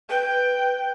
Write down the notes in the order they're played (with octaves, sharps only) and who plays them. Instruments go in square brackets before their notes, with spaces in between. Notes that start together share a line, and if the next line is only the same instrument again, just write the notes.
[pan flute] B4 [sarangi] G5